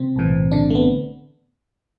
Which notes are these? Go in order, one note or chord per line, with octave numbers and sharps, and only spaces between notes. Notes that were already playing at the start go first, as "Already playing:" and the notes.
Already playing: C3 C4
B1 A2 E3
D3 D4
A3
B3